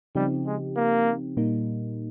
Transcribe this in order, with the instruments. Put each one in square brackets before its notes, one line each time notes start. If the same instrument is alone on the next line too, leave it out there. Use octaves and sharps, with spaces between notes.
[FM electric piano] C#3 F3 C4 D#4 G4 [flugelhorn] G3
[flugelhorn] G#3
A#3
[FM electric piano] A#2 G3 A#3 D#4